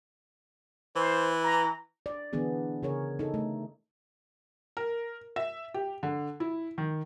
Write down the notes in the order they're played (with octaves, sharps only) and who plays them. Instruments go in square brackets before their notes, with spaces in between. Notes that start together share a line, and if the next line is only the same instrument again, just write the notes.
[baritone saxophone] E3 [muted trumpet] C5
[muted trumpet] A#5
[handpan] D5
D3 E3 B3 D4 G#4
C#3 G#4 A#4 C#5
D#4 A4
A3
[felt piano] A#4
E5
G4
D3
E4
D#3